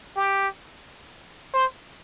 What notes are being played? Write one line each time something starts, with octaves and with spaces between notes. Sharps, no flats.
G4
C5